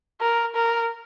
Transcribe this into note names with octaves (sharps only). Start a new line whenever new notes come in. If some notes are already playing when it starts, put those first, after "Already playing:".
A#4
A#4